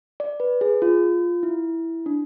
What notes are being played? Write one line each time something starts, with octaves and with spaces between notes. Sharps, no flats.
D5
B4
G#4
F4
E4
D4